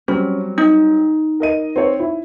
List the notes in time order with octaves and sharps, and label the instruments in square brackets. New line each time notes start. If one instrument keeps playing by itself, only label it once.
[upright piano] F#3 G3 C4 [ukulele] C#4
[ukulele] D#4
[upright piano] A#4 D#5 D#7
C4 C#5
E4